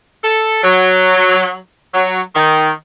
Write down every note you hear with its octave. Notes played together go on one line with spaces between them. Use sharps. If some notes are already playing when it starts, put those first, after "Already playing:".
A4
F#3
F#3
D#3